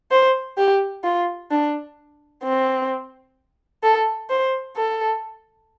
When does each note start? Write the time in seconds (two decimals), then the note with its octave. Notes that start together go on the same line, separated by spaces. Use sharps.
0.11 C5
0.58 G4
1.04 F4
1.51 D4
2.44 C4
3.83 A4
4.30 C5
4.77 A4